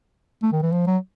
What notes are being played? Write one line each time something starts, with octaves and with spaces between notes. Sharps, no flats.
A3
D#3
E3
F3
F#3